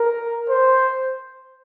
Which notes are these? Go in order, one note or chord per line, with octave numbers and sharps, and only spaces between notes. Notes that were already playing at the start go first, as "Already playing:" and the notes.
Already playing: A#4
C5